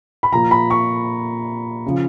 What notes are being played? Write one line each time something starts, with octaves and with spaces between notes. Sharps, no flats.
B5
A#2 F3 A#5
B5
C#6
C#3 F3